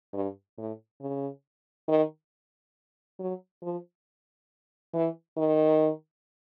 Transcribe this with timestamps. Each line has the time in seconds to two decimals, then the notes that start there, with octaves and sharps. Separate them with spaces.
0.14 G2
0.58 A2
1.01 C#3
1.88 D#3
3.20 F#3
3.63 F3
4.94 E3
5.37 D#3